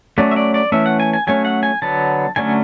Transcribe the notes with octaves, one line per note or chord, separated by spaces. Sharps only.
F#3 A3 C#4 D5
E5
D5
D5
E3 A3 C#4 E5
F#5
G#5
G#5
F#3 A3 C#4 G#5
F#5
G#5
D3 F#3 B3 A5
D3 F#3 A3 C#4 G#5